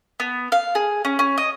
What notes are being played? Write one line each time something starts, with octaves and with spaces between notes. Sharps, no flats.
B3
F5
G#4
C#4
C#4
D#5